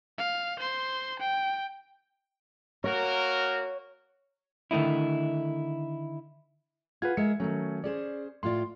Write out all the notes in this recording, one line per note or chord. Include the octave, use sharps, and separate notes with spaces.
F5
C5 C6
G5
A#3 F#4 A#4 C#5
D3 D#3 A3 D#4 E4
F4 G#4 B4 F#5 G#6
G#3 A#4 E5 C#7
D#3 F#3 A3 C#4
C#4 G#4 C5 D5
A2 F4 D5 C6